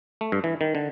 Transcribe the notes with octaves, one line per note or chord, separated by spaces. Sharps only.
A3
G2
E3
D#3
D3